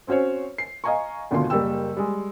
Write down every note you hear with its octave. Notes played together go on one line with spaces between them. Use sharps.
C4 C#4 F#4 C5 C#5
C7
D#5 F5 G#5 A#5 C#6
G#1 D2 B2 F4 C6
F#1 G3 A#3 G5 E6
G3 G#3